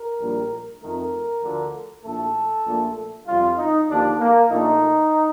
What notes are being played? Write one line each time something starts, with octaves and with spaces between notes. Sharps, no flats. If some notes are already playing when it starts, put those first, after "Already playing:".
Already playing: A#4
A#1 A2 G3
F2 D#3 A3 A#4
D2 D3 F3
A#1 A2 A3 A4
A#1 A#2 A3
F2 C3 G3 F4
D#4
D#2 D3 F3 D4
A#3
A#1 A#2 A3 D#4